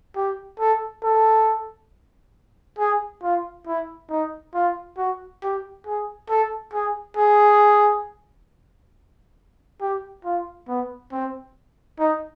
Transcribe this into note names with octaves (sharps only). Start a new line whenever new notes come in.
G4
A4
A4
G#4
F4
E4
D#4
F4
F#4
G4
G#4
A4
G#4
G#4
G4
F4
B3
C4
D#4